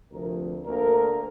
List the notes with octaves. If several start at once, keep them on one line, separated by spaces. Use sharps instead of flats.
D2 C3 F3 A#4
D2 D3 A#3 A#4